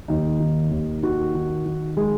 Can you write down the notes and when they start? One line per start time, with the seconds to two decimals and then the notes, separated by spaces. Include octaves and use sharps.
0.08 D#2 D#4
0.40 D#3
0.71 D#2
1.03 D#3 F#4
1.35 D#3
1.66 D#3
1.97 G#3 G#4